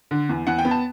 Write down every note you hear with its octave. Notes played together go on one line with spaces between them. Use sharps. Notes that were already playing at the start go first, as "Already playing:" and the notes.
D3
E2
E2 F#5
G5
B3
A5